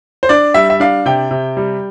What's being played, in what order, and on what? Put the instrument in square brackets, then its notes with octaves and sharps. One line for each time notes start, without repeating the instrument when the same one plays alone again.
[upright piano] C5
D4 D5
G3 E5
E5
D4 F5
C3 G5
C3
G3